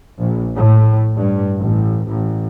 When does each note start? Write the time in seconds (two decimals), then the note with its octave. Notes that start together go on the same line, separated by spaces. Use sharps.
0.18 A#1
0.55 A2
1.15 G2
1.57 A1
2.06 A1